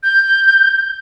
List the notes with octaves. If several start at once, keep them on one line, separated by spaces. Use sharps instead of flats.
G6